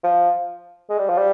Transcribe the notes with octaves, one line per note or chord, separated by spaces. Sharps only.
F3
G#3
G3
F3
G3